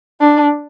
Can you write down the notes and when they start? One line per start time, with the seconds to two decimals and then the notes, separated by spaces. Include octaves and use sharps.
0.21 D4